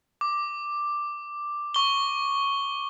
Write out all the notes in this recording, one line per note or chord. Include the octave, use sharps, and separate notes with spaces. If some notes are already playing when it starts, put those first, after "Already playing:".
D6
C#6 G7